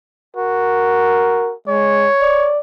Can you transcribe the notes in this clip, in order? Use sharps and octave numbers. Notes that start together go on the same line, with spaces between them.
F#4 A#4
G#3 C#5
D5